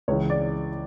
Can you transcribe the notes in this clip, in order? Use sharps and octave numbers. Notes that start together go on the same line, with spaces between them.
C#2 C#3 E3 C#5
D5